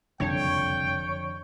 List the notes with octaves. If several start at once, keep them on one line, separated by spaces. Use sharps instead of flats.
F#1 C2 F2 D3 D4 C#5 G5